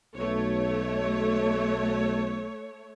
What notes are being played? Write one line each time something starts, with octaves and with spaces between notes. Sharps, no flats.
B1 A3 C#5